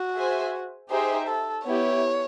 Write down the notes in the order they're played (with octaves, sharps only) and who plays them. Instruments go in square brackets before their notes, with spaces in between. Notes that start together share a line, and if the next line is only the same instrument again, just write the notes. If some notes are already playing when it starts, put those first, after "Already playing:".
Already playing: [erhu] F#4
[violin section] G#4 C5 E5 G#5
[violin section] D#4 G4 C5 E5 [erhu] G#4
[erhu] A4
[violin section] B3 E4 G4 [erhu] C#5